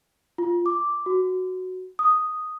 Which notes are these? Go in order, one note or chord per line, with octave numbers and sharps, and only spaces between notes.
F4
D6
F#4
D#6